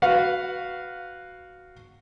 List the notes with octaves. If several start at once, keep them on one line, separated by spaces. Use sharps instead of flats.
F#4 B4 F5 F#5